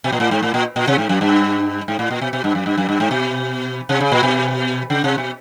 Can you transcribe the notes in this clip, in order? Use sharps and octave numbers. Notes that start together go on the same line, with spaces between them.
B2
A#2
A2
G#2
A2
A#2
A#2
C3
G#2
F#2
G2
G#2
A2
A#2
B2
B2
G2
F#2
G2
F#2
G2
G#2
B2
C3
C#3
A#2
B2
C#3
C3
B2